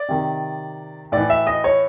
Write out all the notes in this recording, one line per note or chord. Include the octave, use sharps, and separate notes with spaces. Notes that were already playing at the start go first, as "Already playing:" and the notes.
Already playing: D5
C3 D#3
A2 E3 D5
E5
D#5
C#5